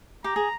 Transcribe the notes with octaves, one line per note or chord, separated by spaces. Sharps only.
G4 A#5
G#4